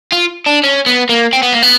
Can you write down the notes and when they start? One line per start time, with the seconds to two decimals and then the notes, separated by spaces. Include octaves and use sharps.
0.12 F4
0.46 D4
0.63 C#4
0.86 B3
1.09 A#3
1.33 C4
1.43 B3
1.53 A#3
1.62 B3